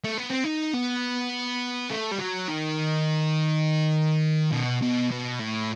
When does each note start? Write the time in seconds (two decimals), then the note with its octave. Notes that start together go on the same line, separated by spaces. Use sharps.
0.04 A3
0.18 B3
0.30 C4
0.44 D#4
0.74 B3
1.90 A3
2.12 G3
2.19 F#3
2.48 D#3
4.52 B2
4.82 B2
5.11 B2
5.39 A2